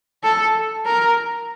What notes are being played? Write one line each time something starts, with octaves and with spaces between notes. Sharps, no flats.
A4
A#4